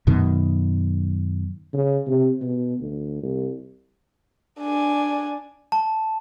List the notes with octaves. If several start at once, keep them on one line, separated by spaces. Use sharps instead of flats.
F#2 B2 D#3
C#3
C3
B2
D2
C2
D4 G#5
A5